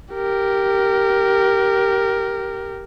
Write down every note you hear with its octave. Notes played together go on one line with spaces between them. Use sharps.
G4 A#4